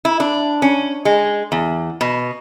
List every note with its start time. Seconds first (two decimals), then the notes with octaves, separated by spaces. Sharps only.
0.05 E4
0.20 D4
0.62 C#4
1.05 G#3
1.52 E2
2.01 B2